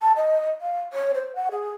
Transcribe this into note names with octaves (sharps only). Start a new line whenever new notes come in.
A5
D#5
F5
C#5
C5
F#5
G#4